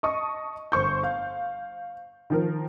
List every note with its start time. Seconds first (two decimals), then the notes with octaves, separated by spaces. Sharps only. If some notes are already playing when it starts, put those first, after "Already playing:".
0.03 D#5 A5 C#6 D#6
0.72 G1 C5 C#6 G6
1.03 F5
2.30 D#3 F3 A#4